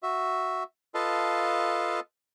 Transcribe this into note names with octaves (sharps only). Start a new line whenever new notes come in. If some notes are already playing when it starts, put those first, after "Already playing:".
F#4 E5
F4 A4 B4 D#5 F5 A5